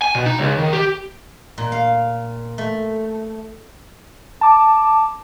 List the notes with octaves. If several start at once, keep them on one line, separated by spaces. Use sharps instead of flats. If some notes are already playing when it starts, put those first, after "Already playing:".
G#5
B2
D#4
C#2
D#3
G4
A#2
F5
A3
A5 D6